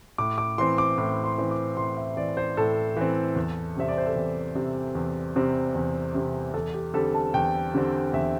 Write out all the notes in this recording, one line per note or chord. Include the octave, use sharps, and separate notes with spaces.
A2 D6
D6
E3 C4 C6
D6
A2 D6
C6
E3 C4
D6
A2 C6
E5
E3 C4 D5
C5
A2 A4
E3 C4
E2
C3 G3 C4 E5
D5
C5
A4
E2 G4
C3 G3 C4
E2
C3 G3 C4
E2
C3 G3 C4
E2 A4
G4
D3 G3 C4 A4
A5
E2 G5
D3 G3 C4
E2 E5